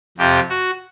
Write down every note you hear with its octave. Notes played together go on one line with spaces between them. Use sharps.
F2 C3 F3 G4
F#4